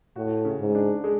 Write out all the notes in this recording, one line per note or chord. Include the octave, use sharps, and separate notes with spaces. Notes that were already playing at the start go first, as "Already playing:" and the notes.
A2 F#4
C#3
G#2
D4
G#3